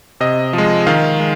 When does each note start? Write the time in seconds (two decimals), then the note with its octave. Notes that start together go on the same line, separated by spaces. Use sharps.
0.20 C3 D#5
0.53 F3 G#3
0.87 D#3 F5
1.20 G#3